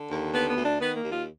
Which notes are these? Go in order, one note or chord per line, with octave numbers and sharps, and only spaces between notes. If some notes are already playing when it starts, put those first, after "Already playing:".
Already playing: D3
D#2
D3 B3
B3
D2
D4
D#3 B3
A#3
D#2
F4